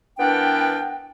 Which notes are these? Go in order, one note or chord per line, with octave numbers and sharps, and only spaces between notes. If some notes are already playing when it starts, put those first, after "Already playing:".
E3 B3 D4 A#4 F#5 G5